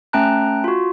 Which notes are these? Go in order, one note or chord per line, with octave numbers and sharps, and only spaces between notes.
A3 C#4 G5 A5 A#5 F#6
F4 F#4